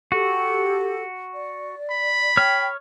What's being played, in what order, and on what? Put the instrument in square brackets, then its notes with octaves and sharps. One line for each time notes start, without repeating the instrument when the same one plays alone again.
[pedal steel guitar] F#4 [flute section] G4 A4
[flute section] D5
[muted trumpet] B5
[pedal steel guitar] C#5 F6 [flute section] G5